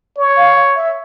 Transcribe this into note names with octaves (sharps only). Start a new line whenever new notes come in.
C#5
F5
E5